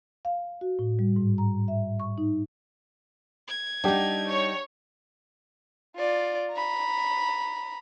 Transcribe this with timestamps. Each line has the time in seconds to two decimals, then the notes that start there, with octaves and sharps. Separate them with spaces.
0.25 F5
0.61 F#4
0.79 A2
0.99 G3
1.16 G#2
1.38 A#5
1.68 E5
2.00 C#6
2.18 D#4
3.47 G#6
3.84 G3 D4 D#4 G4 F#5
4.28 C#5
5.97 F4 D5
6.52 A#5 B5